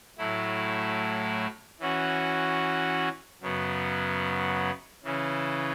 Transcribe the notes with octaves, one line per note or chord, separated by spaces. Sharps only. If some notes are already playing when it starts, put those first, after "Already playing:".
A2 F#3 A3 E4
E3 C#4 F#4
F#2 C#3 F#3 B3
C#3 E3 C#4